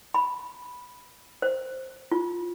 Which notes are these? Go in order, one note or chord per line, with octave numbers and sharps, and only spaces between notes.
B5
C5
F4